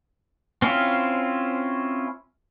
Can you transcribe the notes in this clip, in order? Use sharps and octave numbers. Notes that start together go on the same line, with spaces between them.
C4 C#4 E4 F4